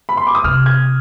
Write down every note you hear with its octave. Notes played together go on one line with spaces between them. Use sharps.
B5
C6
D6
D#6
C3 F6
G#6